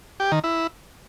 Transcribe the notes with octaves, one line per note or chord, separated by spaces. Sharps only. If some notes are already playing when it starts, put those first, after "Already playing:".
G4
D#3
E4